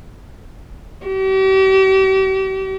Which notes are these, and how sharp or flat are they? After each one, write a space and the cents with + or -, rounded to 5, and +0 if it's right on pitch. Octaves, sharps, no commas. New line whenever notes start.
G4 -40